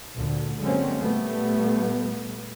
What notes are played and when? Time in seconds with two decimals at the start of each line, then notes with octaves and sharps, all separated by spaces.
0.17 D2 A#2 D3
0.62 D3 F#3 G#3 A#3 C4 C#4
1.00 A#2 G3 A3 B3